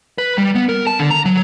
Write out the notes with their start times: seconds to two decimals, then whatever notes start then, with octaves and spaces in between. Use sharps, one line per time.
0.18 B4
0.38 G3
0.55 B3
0.69 A#4
0.87 A5
0.99 D3
1.10 A#5
1.26 F#3